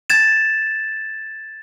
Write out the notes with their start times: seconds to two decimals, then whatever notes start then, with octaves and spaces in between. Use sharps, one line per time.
0.10 G#6 A6 E7